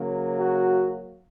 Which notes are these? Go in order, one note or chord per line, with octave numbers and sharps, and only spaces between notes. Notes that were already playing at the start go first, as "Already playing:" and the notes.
Already playing: C#3 F#3 A#3
F#4